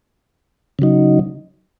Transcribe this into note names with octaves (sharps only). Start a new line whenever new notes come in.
C#3 F#3 D#4